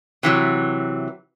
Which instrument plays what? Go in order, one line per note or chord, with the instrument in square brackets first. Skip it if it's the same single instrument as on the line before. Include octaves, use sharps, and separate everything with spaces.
[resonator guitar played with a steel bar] C3 E3 F#3